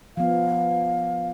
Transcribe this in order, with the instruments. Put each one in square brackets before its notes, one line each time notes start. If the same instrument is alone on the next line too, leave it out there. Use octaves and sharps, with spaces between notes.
[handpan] F3 B3 [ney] F5